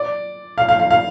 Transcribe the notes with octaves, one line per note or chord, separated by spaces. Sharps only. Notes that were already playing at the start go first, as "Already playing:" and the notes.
Already playing: D5
F5
F5
F5
F5